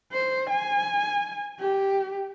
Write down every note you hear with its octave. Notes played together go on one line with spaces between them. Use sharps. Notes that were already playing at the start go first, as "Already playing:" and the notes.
C5
G#5
G4